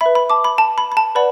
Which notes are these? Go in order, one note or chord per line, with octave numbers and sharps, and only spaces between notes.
B4 E5 B5
B5
A5 D6
B5
A5
B5
B5
A5
B4 D5 F#5 B5